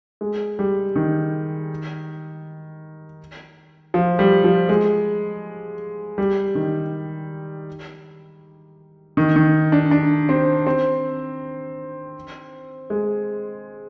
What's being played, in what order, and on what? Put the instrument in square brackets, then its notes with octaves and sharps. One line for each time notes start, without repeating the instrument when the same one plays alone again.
[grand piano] G#3
G3
D#3
F3
G3
F3
G#3
G3
D#3
D#3
D#3
D4
D4
C4
C4
G#3